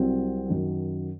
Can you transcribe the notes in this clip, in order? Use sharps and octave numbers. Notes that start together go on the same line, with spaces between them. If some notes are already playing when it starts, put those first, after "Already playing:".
Already playing: C2 C3 F#3 C4
F#2 D#3 F#3